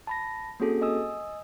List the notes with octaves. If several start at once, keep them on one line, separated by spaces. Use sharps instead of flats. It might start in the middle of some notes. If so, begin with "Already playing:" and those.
A5 B5 A#6
A#3 C4 C#4 F#4 G#4 A4
D#5 G#5 D#6 E6